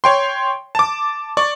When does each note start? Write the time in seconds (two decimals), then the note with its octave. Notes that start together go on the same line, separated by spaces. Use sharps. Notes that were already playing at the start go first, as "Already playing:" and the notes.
0.04 C#5 G5 C6
0.75 A5 D6
1.37 D5 C#6